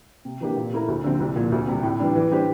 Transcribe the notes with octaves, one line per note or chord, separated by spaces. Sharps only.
C3
E3 A#3 D4 G4
A#2
A3 E4 A#4
D2
D3 F3 C4
C2
A#2 F3
D2
C3 G3
A2
E3 G3 D4
E3
G3 D4 G4 C5